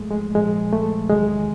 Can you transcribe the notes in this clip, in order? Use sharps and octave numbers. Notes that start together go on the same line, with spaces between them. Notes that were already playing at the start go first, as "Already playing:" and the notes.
Already playing: G#2 F3 G#3 A3
G#3
A#2 F3 G#3
A3
E2 C3 D#3 F#3 G#3